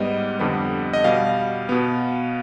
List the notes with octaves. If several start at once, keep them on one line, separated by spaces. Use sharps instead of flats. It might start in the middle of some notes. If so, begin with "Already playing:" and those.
Already playing: G#2 G3 B3 D#5
F2 D3 G3 B3
D#5
B2 G3 B3 F5
B2 B3